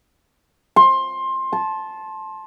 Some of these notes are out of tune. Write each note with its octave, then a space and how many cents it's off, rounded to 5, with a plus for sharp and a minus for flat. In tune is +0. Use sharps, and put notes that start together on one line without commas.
C6 +20
A5 -15